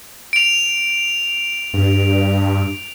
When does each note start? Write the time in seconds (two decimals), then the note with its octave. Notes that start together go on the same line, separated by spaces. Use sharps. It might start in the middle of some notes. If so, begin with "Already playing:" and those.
0.33 D7 F7
1.74 G2